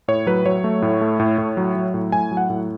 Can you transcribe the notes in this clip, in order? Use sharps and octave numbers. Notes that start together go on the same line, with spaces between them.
A2 C#5
F#3 B4
F#3 C#5
A3
A2
A3
A2
A2
F#3
F#3
A2
A2 G#5
F#3
F#5
A2